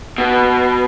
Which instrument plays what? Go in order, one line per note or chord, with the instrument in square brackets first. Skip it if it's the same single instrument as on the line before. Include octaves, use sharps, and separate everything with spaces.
[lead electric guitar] B2